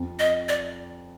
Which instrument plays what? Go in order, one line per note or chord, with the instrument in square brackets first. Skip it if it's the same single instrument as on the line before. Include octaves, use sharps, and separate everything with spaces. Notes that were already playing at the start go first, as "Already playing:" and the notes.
Already playing: [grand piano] F2
[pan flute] D#5
D5